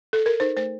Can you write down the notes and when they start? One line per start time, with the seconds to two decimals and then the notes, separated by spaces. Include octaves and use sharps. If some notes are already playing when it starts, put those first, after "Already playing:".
0.13 A4
0.26 A#4
0.40 D#4 C5
0.57 A3 C5